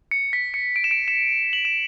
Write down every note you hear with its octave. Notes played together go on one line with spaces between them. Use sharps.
C#7
B6
C#7
D7
E7
D7
E7
F#7
E7